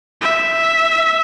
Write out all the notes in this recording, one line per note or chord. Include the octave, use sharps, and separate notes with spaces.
E5